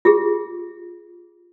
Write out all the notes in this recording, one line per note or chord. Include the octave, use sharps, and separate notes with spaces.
F4 G4 G#4